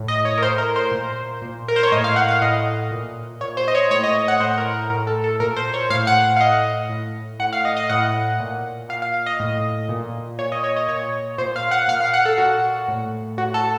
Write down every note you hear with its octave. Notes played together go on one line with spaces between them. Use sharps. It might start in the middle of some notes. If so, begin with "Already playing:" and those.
Already playing: A2
D#5
C#5
A#4
A2 C5
A#4
C5
A#2
A#2
A#4
C5
C#5
A2 D#5
F5
F#5
F5
A2 D#5
A#2
A#2 C#5
C5
D#5
C#5
A2 C#5
D#5
F#5
A2 C5
A#4
A2 A#4
A4
A4
A#2 A#4
C5
C#5
A2 F5
F#5
F5
A2 D#5
A2
A2 F#5
F5
D#5
D#5
A2 F#5
A#2
A#2 F5
F5
F5
D#5
A2
A#2
A#2 C#5
D#5
C#5
D#5
A#2 C#5
A#2 C5
F5
F#5
A#2 F5
F5
F#5
A4
A#2 F#4
A2
A2 F#4
A4